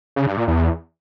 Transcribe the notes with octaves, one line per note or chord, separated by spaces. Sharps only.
C#3
G2
A#2
E2